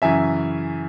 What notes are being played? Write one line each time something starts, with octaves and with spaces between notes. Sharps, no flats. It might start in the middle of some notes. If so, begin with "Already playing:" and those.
F#2 C#3 E3 E5 G#5